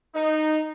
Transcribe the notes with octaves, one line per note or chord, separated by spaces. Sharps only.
D#4